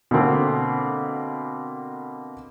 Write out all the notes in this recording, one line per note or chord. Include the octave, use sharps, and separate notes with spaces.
B2 D3 A#3 C4